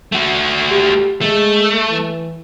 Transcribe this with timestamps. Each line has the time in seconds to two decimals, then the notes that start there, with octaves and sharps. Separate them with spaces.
0.12 A3 F#4
0.71 G4
1.21 G#3 A3
1.90 E3